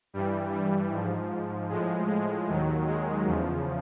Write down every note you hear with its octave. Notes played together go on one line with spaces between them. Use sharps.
G2 E3 G3
G3
G#2 F3
A2 F3 G#3
G#3
D#2 D#3 F#3
G#3
E2 C#3 F3